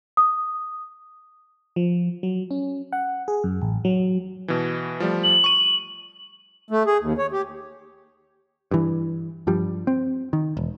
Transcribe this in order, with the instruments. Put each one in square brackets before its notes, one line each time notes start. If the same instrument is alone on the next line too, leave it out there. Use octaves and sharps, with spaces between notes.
[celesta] D#6
[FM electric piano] F3
F#3
C#4
F#5
G#4
F#2
A1
F#3
[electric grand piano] B2 E3
F3 G3 A3
[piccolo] F#7
[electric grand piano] C#6 D#7
[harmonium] A3
G#4
D#2
C#5
G4
[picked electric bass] G2 E3
G2 F3 G3
C4
D#3
E1